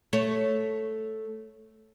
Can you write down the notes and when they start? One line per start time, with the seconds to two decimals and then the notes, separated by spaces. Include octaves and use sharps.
0.13 A3 C#5